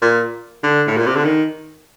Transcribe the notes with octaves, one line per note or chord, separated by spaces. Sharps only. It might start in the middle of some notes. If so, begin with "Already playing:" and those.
A#2
D3
A2
A#2
C3
D3
D#3